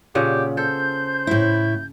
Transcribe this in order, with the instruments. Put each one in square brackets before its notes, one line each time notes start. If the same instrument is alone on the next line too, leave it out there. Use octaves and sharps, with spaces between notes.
[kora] A#2 C#3 F#5 [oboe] G4
[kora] A4 [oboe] C5 [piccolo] G6
[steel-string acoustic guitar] A2 E4